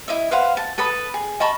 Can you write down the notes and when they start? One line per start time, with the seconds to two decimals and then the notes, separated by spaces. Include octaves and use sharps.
0.08 E4 D#5 E5
0.31 B4 C5 F5 F#5
0.57 A5
0.78 A4 B4 B5 D#6
1.14 G#4
1.40 D#5 A5 B5 C#6